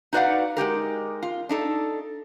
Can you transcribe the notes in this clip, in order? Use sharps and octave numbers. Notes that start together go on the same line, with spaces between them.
D#4 F#4 B4 D5 F5 F#5
G#3 D#4 G4 A#4
F4
D4 D#4 A4